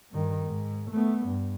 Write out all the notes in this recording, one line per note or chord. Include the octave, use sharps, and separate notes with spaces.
G2 D#3
G#2
A3 B3
G2